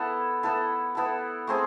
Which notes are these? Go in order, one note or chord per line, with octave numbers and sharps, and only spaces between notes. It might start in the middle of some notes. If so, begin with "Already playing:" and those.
Already playing: B3 E4 A4
B3 E4 A4
B3 E4 A4
A3 C4 G#4